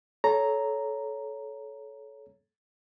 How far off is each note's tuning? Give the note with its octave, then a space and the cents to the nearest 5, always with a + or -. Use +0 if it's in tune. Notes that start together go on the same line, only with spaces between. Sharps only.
A4 -25 C#5 +10 A#5 -5